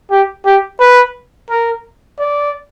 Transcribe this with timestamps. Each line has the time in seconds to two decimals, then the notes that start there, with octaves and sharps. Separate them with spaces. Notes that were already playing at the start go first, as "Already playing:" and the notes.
0.11 G4
0.46 G4
0.80 B4
1.50 A#4
2.19 D5